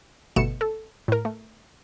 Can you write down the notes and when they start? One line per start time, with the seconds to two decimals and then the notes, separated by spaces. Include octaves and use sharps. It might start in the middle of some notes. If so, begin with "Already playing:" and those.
0.36 G1 B2 A3 C#7 E7
0.61 A4
1.08 A2 A#4
1.25 A3